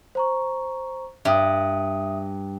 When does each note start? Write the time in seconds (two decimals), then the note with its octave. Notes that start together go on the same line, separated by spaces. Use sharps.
0.15 C5 A#5 C#6
1.25 G2 E5 D#6